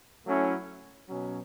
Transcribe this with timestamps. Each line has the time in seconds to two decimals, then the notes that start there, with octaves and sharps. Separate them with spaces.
0.25 F#3 A3 C#4 E4
1.08 B2 F#3 C#4